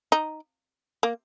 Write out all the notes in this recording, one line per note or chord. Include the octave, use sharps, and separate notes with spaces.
D#4
A#3